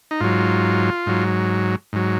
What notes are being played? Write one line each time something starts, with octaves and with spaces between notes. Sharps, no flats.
D#4
G#2 F#3 F4
G#2 F#3
G#2 F#3